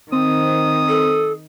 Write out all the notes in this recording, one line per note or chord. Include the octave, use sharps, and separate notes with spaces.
D#3 C4 D#6
A4